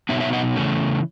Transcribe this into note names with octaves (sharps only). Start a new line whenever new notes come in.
B2 F#3 B3 D#4 C#5 E5
C#5 E5
D#5 F#5
C#3 E3 A3 C#4